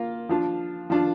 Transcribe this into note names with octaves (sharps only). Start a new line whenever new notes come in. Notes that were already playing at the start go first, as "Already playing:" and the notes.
Already playing: A#3 F4
F3 D4 F4
F3 D4 F4